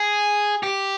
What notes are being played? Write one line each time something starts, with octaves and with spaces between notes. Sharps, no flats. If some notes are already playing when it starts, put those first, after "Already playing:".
Already playing: G#4
G4